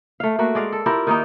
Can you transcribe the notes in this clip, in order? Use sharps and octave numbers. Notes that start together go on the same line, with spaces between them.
A3 F5
A3 A#3 F#4
G#3 D5 F5
A4
E4 F4 G4 A#4
D#3 A#3 D#4